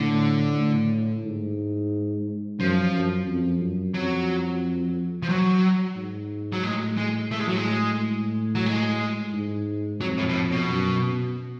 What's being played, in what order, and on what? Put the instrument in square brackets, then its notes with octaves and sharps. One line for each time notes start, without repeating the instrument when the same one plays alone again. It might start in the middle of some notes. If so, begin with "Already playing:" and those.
Already playing: [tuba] A2 [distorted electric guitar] D3
[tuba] A2
G#2
[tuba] F#2 [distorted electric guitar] F3
[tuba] F#2
F2
F#2
[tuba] F2 [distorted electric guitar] F#3
[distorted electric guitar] F3
F#3
[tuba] G#2
[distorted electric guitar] F#3
[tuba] A2 [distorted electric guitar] G#3
[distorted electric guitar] G#3
[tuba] A2 [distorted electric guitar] A3
[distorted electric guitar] G#3
F#3
G#3
[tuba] A2
[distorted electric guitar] F#3
G#3
[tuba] G#2
[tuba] F2 [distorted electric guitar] F#3
[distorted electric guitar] A2
B2
A2
B2
[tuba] F#2
B2